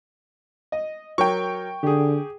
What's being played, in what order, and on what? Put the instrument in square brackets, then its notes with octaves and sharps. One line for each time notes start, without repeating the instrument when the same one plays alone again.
[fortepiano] D#5
[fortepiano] F#3 A#4 C#5 [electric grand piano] G5 C#6
[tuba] D3 [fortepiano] G4 G#4